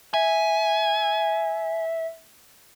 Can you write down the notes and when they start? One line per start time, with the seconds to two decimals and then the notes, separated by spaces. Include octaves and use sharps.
0.14 E5 G#5